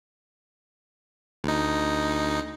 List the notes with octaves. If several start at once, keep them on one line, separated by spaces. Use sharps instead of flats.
D2 D#4